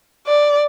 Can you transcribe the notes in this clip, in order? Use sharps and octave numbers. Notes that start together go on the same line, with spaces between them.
D5